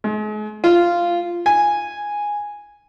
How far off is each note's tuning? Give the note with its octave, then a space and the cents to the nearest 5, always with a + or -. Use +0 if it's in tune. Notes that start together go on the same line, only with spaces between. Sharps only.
G#3 +40
F4 -10
G#5 -5